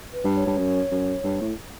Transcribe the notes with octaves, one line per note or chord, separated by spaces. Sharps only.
B4
G2
C#5
G2
F#2
F#2
G2
A2